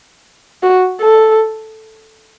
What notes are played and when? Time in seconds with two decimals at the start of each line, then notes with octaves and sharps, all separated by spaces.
0.63 F#4
1.00 A4